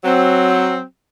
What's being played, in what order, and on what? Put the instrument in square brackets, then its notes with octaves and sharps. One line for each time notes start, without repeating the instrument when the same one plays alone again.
[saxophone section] F#3 C4